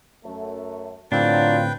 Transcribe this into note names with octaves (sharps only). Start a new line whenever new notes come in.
F#2 A3
A2 D3 F#3 C4 D4 F4 B4 G5